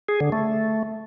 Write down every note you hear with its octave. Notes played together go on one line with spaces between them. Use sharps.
G#4
D3
A3